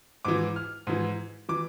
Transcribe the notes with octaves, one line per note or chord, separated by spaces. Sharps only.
G#2 E3 D6
F6
G#2 E3
E3 D6